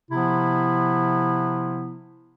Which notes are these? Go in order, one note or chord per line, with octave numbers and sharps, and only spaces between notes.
C3 F3 B3 E4